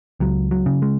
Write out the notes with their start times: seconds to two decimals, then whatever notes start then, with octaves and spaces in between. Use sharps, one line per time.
0.20 C#2 F#3
0.51 F#3
0.66 C#3
0.82 G#3